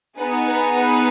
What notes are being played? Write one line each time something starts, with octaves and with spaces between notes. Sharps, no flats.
B3 D#4 G#4 B4
B4
B4